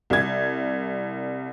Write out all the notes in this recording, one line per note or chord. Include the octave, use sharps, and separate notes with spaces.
C2 G#6